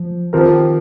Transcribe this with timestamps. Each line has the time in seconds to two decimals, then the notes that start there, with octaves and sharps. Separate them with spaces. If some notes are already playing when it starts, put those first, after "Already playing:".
Already playing: F3
0.33 D#3 F3 C4 G4 A#4